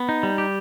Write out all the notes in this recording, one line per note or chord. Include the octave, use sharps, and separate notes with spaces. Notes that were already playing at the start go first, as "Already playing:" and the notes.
Already playing: B3
D#4
G3
G4